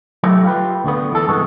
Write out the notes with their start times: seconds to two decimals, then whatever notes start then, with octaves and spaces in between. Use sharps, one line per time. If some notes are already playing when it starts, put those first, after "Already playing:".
0.23 F#3 A3 D#4 E4 G4 D#5
0.44 F4 G4 B4
0.84 D2 D3 B3
1.12 E3 A4
1.28 G2 C3 E3 G#3 B3 F#4